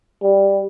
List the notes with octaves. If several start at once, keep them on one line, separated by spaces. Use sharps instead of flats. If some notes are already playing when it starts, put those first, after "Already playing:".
G3